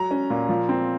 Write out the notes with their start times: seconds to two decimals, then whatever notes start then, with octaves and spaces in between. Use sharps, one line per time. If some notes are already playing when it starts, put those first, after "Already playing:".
Already playing: F#3 A#5
0.11 C#4
0.30 A#2
0.49 F3
0.69 C4